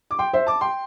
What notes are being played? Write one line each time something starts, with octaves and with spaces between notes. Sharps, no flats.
D6
G5 C6
C5 E5
A5 D6
G5 C6